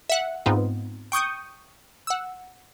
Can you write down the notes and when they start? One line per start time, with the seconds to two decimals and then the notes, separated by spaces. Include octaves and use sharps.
0.09 E5 F#5
0.46 G#2 B3 C4 D#4 F4
1.12 G5 C#6 D#6 G6
2.07 F#5 E6